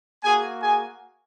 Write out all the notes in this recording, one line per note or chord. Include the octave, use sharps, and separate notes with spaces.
A#3 F#4 G#4 G#5
G#4 G#5